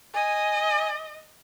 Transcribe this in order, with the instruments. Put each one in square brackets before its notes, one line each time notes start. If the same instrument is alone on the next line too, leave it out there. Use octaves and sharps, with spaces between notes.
[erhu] D#5 [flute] G#5